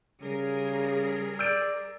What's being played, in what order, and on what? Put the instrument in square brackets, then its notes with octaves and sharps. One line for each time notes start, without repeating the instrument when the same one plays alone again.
[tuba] C#3 [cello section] G3 G#4 A#4
[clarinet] D5 [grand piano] E6 G6 D7